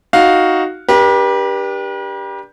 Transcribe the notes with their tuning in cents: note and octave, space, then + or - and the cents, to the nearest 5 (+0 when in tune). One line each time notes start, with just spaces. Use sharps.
D#4 +10 F#4 +0 F5 +0
D4 +0 G4 +10 B4 -45